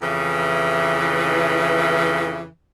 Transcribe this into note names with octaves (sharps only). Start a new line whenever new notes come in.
F2 C#3 E3